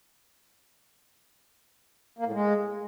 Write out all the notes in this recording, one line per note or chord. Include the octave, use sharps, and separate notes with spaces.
A#3
A2
G#3